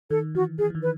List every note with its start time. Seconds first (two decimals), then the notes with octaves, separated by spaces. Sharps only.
0.10 D#3 A4
0.35 E3 F#4
0.58 E3 G#4
0.70 E3
0.75 D#3
0.83 B4